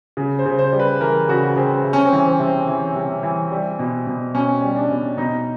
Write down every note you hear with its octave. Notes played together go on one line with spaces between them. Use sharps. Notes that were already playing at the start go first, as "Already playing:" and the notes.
C#3
C5
C#3
C5
G3
B4
E3 A#4
C#3 F#4
C#3 C4
C3
C#4
C4
E3
C4
C3
C4
E3
C3
E3
G3
B2
B2
B2 C#4
G3
D4
B2
B2 D#4